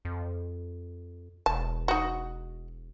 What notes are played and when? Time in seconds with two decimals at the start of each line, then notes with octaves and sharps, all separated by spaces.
0.05 F2
1.46 E1 A5
1.88 D#4 F#4